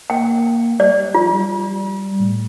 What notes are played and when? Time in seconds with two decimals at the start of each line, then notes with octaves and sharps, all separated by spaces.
0.10 A#3 G5
0.79 G3 D5
0.97 G3
1.14 F3 F4
1.32 G3
2.20 A2